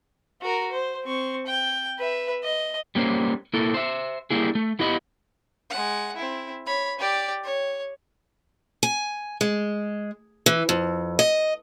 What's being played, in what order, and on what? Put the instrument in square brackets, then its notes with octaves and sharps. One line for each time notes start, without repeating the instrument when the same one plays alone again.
[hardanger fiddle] F#4 A#4
C5
C4 C#6
G5
B4 E5
D#5
[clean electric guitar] G3 A#3 C#4 C5
A#3 E4 A4 A#4
C5 E5
G3 A#3 E4 G#4
A3
B3 E4 G4 D#5 B5
[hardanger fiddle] G#3 F#5
C4 E4
C#5 B5
G4 D5
C#5
[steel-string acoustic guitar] G#5
G#3
E3
F2
D#5